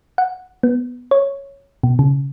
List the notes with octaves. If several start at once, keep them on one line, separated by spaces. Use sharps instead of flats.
F#5
B3
C#5
B2
C#3